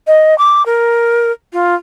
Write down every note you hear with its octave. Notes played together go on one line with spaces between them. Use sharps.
D#5
D6
A#4
F4